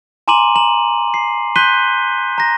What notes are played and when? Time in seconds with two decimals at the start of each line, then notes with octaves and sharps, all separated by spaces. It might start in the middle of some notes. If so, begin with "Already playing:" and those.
0.28 G#5 A#5 C6 D6 D#7 F#7
0.56 A#5 F#7
1.14 C7
1.56 C6 F#6 G6 B6 D#7 G7
2.38 A#5 A#6